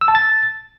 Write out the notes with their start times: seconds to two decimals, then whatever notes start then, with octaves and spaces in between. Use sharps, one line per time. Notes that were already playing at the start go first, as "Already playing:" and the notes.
0.01 E6
0.08 A5
0.15 A6